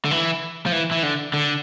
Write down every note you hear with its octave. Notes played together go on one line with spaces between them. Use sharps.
D3
E3
F3
E3
E3
D3
D3